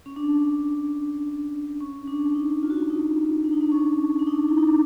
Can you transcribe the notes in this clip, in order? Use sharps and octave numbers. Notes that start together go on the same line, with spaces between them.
C#4
D4
C#4
D4
D#4
F4
F#4
F4
D#4
D4
D#4
D4
C#4
D4
D#4
E4
D#4
D4